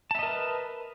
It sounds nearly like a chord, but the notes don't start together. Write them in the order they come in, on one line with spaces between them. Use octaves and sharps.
A5 E5 D#5 A#4 B4